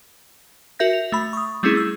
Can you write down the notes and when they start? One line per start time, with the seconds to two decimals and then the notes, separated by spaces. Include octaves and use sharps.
0.79 F#4 A#4 E5 G6 A#6
0.93 F7
1.12 A3 B5
1.33 C#6 D#6
1.63 G3 A3 C4 C#4 E4 G#4
1.77 E6